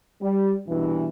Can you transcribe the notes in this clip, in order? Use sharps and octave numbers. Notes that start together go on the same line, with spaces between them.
G3
G2 B2 E3